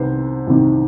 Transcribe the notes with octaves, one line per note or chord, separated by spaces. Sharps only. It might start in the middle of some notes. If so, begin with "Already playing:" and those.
Already playing: C2 C3 D#3 B4 C5
C2 C3 D#3